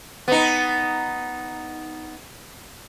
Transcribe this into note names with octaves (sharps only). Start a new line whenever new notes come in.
B3 D#4